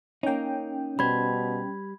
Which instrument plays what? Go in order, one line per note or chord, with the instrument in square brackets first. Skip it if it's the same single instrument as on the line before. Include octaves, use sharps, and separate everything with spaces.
[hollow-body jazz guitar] A#3 D#4 [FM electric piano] C#4 G5
[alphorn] B2 [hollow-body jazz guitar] G3 C5 [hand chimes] B5 G#6